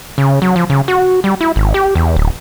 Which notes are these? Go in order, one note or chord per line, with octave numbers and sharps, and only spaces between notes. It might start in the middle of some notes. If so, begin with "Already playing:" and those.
C#3
F#3
F3
C#3
F#4
G3
E4
G#1
G4
E2
D1